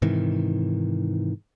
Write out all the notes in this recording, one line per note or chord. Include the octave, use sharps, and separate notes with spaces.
G#2 C3 D#3 E3